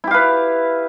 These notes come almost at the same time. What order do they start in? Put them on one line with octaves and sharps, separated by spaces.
E4 G4 F5 B4